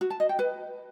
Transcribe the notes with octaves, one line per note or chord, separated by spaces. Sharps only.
F#4
A5
D#5
G5
B4